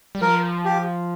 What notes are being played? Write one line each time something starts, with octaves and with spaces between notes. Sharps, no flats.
G3
F3 A#4
G4